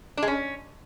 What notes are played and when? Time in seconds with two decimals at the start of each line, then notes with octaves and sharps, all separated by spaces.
0.17 D4
0.23 G#3
0.28 C#4